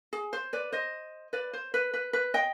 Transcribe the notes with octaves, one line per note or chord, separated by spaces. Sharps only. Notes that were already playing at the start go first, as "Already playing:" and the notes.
G#4
C5
B4 D5
C5 D#5
B4 D5
C5
B4
B4
B4
D#5 G5